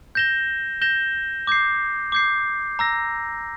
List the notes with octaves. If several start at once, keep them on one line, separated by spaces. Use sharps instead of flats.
G6 A#6 E7 G7
G6 A#6 E7 G7
D6 G6 C7
D6 G6 C7
A#5 E6 A#6